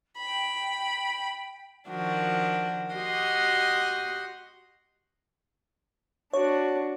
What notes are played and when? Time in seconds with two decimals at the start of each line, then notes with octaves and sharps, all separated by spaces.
0.19 G5 B5
1.89 D#3 F3 D4 F#4
2.94 F#4 G4 D#5 F#5 C6 D#6
6.33 D4 F#4 C#5